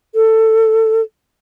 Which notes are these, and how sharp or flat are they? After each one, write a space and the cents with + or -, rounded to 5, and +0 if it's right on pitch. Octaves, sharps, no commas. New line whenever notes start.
A4 +15